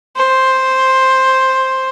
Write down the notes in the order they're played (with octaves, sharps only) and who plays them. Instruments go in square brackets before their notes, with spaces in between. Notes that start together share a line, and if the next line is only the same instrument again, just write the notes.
[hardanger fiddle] C5